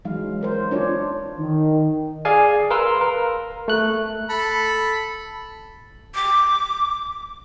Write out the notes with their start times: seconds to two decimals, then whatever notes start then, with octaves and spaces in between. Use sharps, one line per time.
0.05 E3 F#3 G#3 D#4 F5
0.41 D#4 A#4 C5
0.71 D4 F4 C#5 D5
1.38 D#3
2.25 G#4 D5 F5 G#5
2.70 A#4 B4 F5 C6 E6
3.01 A#4
3.68 A3 F#6
4.30 A4 B5
6.15 D6